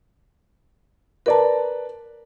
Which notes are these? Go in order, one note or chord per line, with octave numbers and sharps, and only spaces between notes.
A#4 B4 D5 A5 A#5